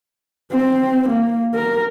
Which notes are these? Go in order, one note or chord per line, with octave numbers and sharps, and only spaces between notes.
C4
A#3
A#4